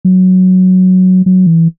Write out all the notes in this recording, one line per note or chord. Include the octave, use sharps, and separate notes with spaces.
F#3
F#3
E3